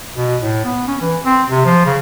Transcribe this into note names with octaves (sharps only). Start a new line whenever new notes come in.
B2
A2
B3
C#4
E3
C4
C3
F3
C#3